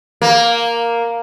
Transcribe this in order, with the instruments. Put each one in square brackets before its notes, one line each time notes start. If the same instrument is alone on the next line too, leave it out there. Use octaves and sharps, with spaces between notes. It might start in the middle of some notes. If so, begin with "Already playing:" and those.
[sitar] A#3